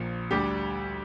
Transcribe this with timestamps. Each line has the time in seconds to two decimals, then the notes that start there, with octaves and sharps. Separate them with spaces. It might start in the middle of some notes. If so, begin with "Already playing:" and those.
Already playing: A#1 A#2 F3
0.31 D2 D3 G3 D4 G4